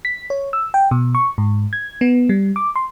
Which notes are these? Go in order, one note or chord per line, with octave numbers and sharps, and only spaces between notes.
B6
C#5
E6
G5
B2
C#6
G#2
G#6
B3
G3
D6
C6